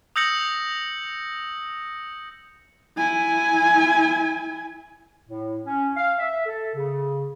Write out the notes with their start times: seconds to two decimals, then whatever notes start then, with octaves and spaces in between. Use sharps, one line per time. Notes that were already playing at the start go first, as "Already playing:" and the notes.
0.16 D#6 E6 G6 A#6 C#7 F#7
2.97 E4 G#5
5.28 A2
5.66 C#4
5.96 F5
6.18 E5
6.46 A4
6.74 C#3